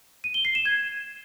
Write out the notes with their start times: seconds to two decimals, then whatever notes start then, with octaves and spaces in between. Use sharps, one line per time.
0.24 D#7
0.34 G7
0.45 C7
0.55 E7
0.65 G#6